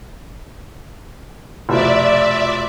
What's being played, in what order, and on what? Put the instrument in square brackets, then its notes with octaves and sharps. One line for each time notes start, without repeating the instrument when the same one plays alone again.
[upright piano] F1 B2 F3 [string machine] D5 E5